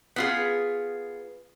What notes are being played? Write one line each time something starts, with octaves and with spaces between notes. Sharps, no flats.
B3 F4 G#4